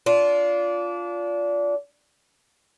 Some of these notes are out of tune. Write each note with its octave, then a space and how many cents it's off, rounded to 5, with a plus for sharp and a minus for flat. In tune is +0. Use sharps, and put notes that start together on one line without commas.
D4 -25 F4 +0